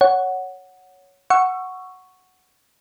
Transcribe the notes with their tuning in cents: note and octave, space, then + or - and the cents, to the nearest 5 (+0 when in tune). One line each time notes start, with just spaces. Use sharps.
C#5 +5 F#5 +0
F#5 +0 C#6 +0 E6 +25